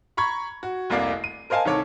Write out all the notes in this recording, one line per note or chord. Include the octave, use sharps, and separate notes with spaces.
A#5 B5 C#6 G#6
F#4
F1 C2 A#3 D5 D6 C7
D#7
A#4 C5 D#5 F5 G#5 A5
C2 D#3 A4 C#5 D6